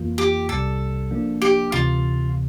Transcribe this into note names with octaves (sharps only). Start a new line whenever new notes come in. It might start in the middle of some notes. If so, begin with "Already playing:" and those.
Already playing: F2 E3 A#3 F4
G4
C2 C3 G3 A4
F3 A#3 D4
G4
D2 C3 E3 F4